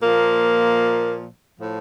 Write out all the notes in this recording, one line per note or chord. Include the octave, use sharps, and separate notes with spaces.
A#2 F3 A#3
A2 F3